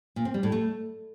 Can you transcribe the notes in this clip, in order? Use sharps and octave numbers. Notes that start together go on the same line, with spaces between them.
A#2
C4
G3
A2
A3